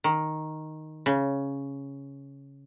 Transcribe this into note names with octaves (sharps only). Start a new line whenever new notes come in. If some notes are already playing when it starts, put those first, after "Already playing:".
D#3
C#3